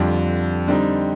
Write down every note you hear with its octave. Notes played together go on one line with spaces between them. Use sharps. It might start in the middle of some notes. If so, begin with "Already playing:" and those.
Already playing: F2 D3 G3 D4 F4
D3 G3 C4 D#4